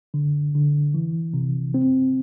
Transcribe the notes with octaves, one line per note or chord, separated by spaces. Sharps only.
D3
D3
E3
C3
C4